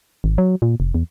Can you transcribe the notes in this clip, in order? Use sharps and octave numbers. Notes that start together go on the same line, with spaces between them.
G#1
F#3
A#2
F1
E2